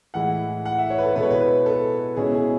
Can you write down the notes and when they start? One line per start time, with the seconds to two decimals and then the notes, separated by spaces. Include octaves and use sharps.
0.14 A2 E3 G#3 F#5
0.65 F#5
0.78 E5
0.90 C#5
0.98 B4
1.03 A4
1.15 B2 G#3 B3 E4 B4
1.23 C#5
1.30 B4
1.41 B4
1.66 A4
2.16 B2 G#3 C#4 E4 G#4
2.34 G#4